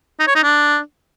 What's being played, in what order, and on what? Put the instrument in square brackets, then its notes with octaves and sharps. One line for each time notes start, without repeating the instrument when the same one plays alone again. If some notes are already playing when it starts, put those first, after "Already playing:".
[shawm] D#4
C#5
D#4
D4